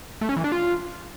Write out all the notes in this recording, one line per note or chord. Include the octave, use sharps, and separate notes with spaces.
A3
C#4
E3
D4
F4